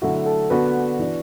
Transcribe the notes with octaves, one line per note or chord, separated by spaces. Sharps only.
D3 F#3 A3 E4 F#4
A4
D3 B3 D4 F#4 B4
E3 D4